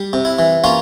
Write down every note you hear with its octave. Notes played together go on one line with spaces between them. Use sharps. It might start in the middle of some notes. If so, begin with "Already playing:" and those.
Already playing: G3
C3
E4
E3
A#3 C#4 F4